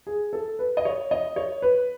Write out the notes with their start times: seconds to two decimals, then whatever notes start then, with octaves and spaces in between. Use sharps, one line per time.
0.07 G#4
0.33 A4
0.59 B4
0.77 D#5
0.85 C#5
1.11 D#5
1.36 C#5
1.62 B4